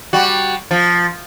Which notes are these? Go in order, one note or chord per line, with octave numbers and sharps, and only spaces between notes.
G3 F#4
F3